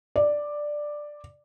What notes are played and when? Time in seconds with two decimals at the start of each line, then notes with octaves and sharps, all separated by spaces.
0.16 D5